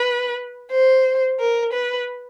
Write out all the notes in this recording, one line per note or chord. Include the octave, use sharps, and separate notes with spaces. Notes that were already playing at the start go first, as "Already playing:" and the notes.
Already playing: B4
C5
A#4
B4